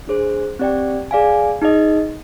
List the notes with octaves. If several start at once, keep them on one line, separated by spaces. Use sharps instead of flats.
D4 G#4 C5
C4 G4 D5 G5
G#4 D5 F5 G#5
D#4 G#4 D#5